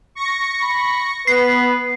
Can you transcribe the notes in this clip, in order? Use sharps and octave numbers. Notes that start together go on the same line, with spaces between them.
C#6 A#6 C#7
B5
B3 B4 C7